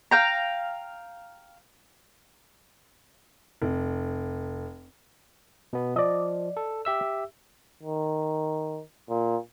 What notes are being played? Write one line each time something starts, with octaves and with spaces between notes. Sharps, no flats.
F5 G5 A#5
F1
B2 B3
F3 D5 D#5
A4
G4 E5 E6
D#3
A#2